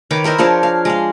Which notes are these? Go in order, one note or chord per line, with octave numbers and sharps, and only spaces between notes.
D#3 B4 C#5 D6
E4 A#4 C5 D#5
F3 D4 G#4 C#5
F5
G#3 F5